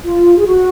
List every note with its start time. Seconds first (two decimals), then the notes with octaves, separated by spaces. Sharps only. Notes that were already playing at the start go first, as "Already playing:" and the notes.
0.05 F4
0.38 G#4
0.47 F#4